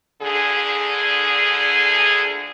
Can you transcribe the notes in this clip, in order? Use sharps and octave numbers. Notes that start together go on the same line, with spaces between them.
D2 A#2 D3 G#4